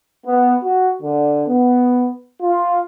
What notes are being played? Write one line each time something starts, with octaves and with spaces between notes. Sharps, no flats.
B3
F#4
D3
B3
F4